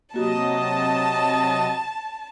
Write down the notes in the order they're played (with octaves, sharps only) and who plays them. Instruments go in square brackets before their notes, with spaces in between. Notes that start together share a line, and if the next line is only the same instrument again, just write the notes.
[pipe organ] C3 F#3 D#5 [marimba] A#3 F#4 G4 [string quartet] A5